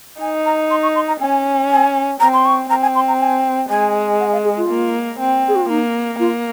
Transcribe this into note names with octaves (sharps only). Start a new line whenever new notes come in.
D#4 G#5
A#5
C6
C#6
C6
A#5
C#4 G#5
G#5
C4 A#5
C6
C#6
C4 A#5
G#5
C6
A#5
G#5
G#3 G#5
F#5
F5
G#4
F4
A#3
C4
G#4
F#4
F4
A#3 D#4
A#3 F4